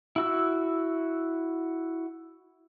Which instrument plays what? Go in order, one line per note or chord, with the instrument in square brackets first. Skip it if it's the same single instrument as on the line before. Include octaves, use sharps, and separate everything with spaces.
[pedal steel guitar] E4 F#4 E6